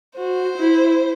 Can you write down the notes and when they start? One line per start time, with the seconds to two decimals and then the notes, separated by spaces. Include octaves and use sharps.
0.16 F#4 C5
0.58 E4